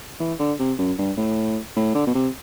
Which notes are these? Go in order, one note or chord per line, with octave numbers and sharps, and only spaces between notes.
E3
D3
C3
F#2
G2
A2
A2
D3
B2
C3